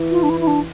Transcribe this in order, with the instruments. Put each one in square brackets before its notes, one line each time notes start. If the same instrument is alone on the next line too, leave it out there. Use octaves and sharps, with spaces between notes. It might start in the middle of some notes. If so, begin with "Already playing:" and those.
Already playing: [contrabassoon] E3
[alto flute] F4
D4
E4
E4
D4